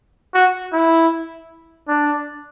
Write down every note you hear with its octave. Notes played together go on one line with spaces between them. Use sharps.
F#4
E4
D4